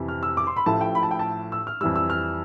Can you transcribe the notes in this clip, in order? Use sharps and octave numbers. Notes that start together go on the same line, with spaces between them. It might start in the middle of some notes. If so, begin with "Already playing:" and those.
Already playing: F2 C3 E3
F6
E6
D6
C6
B5
A1 A2 F3 A3 A5
G5
B5
A5
G5
A5
E6
F6
F2 E3 G3 E6
E6
F6